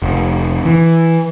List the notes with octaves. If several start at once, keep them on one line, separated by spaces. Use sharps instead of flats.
F1
E3